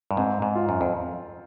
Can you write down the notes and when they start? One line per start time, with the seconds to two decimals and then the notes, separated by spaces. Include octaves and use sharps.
0.11 G2
0.17 G#2 C4
0.42 G#2
0.55 F4
0.69 F#2
0.81 F2